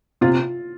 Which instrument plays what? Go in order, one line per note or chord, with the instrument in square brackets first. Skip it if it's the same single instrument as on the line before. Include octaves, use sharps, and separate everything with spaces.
[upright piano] C3 [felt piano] F4